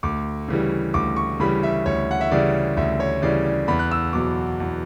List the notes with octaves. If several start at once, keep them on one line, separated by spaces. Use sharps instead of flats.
D2 D6
C#3 E3 G3
D2 D6
C#6
C#3 E3 G3 B5
E5
D2 C#5
F#5
E5
C#3 E3 G3 D5
D2 E5
C#5
C#3 E3 G3 D5
D5
E2 B5
F#6
E6
B2 F#3 D6
E2